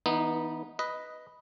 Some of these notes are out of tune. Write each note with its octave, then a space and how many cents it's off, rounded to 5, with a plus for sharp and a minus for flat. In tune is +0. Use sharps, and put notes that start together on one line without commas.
E3 -30 B3 -15 D#4 +0
B4 +0 D#5 +5